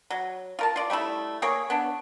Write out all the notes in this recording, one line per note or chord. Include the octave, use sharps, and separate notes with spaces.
F#3
F4 A#4 A5
F4 D5
G3 A3 D#4 E4
A#3 G#4 C#5
B3 D4